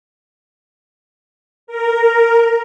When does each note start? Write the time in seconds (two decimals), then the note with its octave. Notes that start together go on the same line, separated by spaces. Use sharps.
1.67 A#4